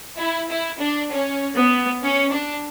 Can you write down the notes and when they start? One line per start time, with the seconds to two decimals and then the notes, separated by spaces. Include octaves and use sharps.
0.18 E4
0.49 E4
0.80 D4
1.11 C#4
1.56 B3
2.03 C#4
2.33 D4